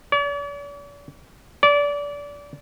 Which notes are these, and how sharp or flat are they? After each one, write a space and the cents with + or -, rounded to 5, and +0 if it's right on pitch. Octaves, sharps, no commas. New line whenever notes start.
D5 -45
D5 -25